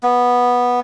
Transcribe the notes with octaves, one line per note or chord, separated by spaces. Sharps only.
B3